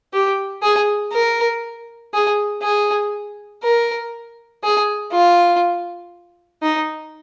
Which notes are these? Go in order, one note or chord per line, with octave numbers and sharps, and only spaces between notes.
G4
G#4
A#4
G#4
G#4
A#4
G#4
F4
D#4